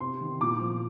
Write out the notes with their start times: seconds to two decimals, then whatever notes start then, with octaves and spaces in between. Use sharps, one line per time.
0.01 C3 C6
0.21 D#3
0.41 A#2 D6
0.61 F3